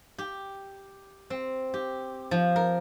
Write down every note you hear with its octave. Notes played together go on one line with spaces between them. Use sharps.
G4
C4
G4
F3
A#4